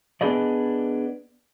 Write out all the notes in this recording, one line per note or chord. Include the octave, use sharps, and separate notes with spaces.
B3 D4 G#4 B4 D5 D#5